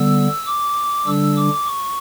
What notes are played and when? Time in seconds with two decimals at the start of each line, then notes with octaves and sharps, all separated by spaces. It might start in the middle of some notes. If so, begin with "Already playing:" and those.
Already playing: D3 G3 B3 E6
0.46 D6
1.06 D3 G3 D4 E6
1.36 D6
1.66 C#6